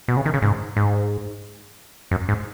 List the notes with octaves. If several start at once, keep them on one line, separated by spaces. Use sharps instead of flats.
B2
C#3
D#3
C#3
G#2
G#2
F#2
G#2